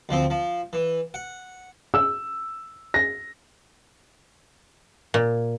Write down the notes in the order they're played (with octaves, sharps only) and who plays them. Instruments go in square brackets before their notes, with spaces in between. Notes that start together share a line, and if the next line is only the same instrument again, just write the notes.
[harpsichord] D2 F3 C4
F3
E3
F#5
[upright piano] E6
A#6
[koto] A#2